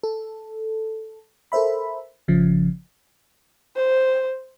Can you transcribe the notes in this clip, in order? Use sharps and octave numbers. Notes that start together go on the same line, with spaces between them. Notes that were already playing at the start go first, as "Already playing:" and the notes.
A4
A4 A#4 C5 E5 B5
A1 C#3 F3
C5